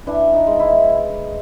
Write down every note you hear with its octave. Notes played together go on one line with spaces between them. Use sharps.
E3 D4
D#4
G#3
E4